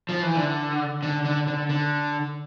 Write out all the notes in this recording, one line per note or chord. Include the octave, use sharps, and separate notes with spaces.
F3
E3
D3
D3
D3
D3
D3